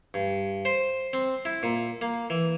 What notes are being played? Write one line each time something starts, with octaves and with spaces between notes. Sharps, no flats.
G2
C5
C4
E4
A#2
A#3
E3